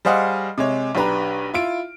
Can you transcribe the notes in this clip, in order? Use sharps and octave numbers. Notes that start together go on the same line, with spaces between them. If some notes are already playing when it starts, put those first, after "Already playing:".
G3 G#4 C5 D#5 F5 F#5
C3 G#3 C#5
B1 D4 G4 B4 A#5
E4 F4 D7